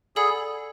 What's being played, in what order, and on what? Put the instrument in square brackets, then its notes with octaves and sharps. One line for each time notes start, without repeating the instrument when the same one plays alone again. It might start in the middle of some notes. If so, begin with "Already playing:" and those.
[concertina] G#4 [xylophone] A4 D5 F#5 B5 E6